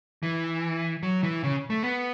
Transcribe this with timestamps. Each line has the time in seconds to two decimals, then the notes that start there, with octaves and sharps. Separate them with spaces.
0.23 E3
1.03 F#3
1.23 E3
1.44 C#3
1.70 A3
1.83 B3